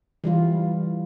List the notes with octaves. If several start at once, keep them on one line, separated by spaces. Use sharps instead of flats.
E3 G3 F4